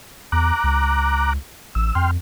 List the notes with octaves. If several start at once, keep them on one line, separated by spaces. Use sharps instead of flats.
E2 A#5 D6 F#6
C#2
A1 E6
F2 G5 C6 F6